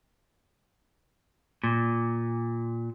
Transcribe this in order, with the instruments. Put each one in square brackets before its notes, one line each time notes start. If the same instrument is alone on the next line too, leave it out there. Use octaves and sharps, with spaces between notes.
[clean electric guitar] A#2